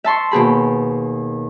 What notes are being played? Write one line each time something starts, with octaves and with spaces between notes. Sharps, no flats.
E5 A5 C6 C#6
D#2 B2 G#4 B5